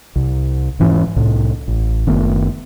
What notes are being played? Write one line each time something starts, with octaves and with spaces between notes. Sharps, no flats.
C2
E1 G#2 E3 C#4
C2 A2
A1
F#1 D#3 A3 B3